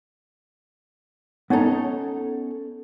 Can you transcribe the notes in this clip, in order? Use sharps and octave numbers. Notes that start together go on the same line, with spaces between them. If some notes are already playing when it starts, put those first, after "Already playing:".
B3 C#4 D#4 A4 A#5